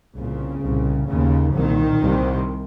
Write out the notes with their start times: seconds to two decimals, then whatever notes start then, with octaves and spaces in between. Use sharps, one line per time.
0.16 C2 A#2 C#3
0.62 C2 A#2
1.08 D#2 C#3
1.54 C2 A#2 D#3
2.00 C2 C3